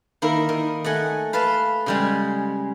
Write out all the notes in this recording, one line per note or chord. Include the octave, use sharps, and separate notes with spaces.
D#3 A#3 E4 A#4
D#3
A3 D#5 F#5 G#5
B4 F5 A5 C6
C#3 G3 G#3